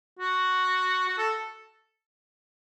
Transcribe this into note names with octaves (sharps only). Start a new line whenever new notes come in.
F#4
F#4
A4